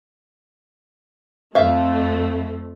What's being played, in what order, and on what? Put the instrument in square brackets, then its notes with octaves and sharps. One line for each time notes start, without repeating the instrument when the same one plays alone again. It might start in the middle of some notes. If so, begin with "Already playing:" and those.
[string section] F2 A3 [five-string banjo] E5 F5